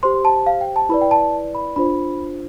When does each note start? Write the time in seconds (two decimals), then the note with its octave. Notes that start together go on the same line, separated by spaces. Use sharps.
0.03 G4 C5 C6
0.25 A5
0.46 F5
0.61 G5
0.76 A5
0.89 E4 B4 D5 B5
1.01 G5
1.11 A5
1.55 B5
1.76 D4 F4 C5 B5